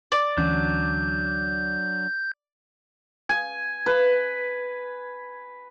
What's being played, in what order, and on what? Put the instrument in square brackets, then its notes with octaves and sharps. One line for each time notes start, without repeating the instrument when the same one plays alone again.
[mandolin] D5
[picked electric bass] D2 E3 C#4 [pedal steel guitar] F#3 D4 [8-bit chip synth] G6
[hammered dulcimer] G#5
B4